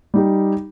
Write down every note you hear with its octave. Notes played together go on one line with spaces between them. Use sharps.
G3 D#4 G4